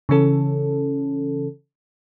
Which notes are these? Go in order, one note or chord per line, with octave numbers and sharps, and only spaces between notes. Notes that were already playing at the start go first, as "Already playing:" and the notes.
C#3 E3 C#4 A4